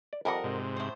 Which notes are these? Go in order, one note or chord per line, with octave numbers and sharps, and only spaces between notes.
D5
F2 G3 A#4 D#5 F#5
G#2 C3
A2 C5